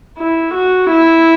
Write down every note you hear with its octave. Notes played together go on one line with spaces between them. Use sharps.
E4
F#4
E4